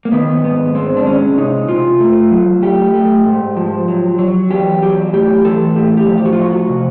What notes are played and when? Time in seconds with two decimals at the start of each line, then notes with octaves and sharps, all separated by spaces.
0.05 A#3
0.12 D#3 B3
0.44 G#2 B3
0.75 G#3 C4
0.96 D4
1.06 G#3 C#4
1.37 C3 D#4
1.68 C3 F4
2.00 A3
2.31 F#3
2.63 A3 G4
2.94 A3
3.25 G#2
3.57 F3
3.88 F#3
4.19 F#3
4.50 E2 G4
4.82 F#3 G4
5.13 A2 G4
5.45 E3 A4
5.76 A2 G4
5.97 G4
6.08 F3
6.18 G4
6.25 F#4
6.33 F4
6.39 A3 F#4
6.69 C3